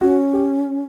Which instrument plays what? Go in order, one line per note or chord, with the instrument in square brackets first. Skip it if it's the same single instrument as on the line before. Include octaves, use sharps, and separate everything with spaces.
[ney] C#4 [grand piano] F#4
[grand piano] G4